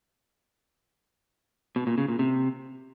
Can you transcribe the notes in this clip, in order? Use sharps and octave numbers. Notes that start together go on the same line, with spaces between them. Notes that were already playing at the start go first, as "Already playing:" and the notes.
B2
A#2
C#3
A#2
C3